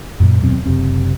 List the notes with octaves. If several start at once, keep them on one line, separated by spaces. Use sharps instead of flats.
F#2 A#2
D#1 F#2 B2 C4
F#1 C3 C4